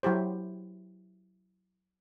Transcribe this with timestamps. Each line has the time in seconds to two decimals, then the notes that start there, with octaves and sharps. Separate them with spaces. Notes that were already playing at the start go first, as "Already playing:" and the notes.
0.03 F#3 E4 G4 C5